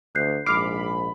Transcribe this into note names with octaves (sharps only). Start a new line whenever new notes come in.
D2 F#6 G6 C7
A#1 G#2 B5 D6 F6 C7